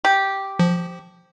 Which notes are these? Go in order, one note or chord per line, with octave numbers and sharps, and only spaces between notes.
G4
F3